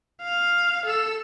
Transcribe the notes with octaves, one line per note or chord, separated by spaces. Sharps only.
F5
A4 E6